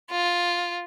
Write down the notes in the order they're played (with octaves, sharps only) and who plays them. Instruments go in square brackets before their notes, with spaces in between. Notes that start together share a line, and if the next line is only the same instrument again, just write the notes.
[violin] F4